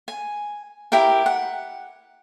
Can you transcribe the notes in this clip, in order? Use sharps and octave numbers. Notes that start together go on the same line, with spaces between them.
G#5
E4 G4 A#4 G5
F#5